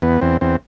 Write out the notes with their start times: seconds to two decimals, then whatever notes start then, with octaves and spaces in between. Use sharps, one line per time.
0.02 E2 B3
0.21 E2 C4
0.41 E2 C4